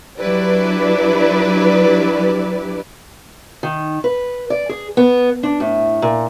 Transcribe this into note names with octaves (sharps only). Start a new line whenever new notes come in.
F#3 D4 E4 G4 B4 D5
D#3
B4
D5
G#4
B3
D4
A2
A#2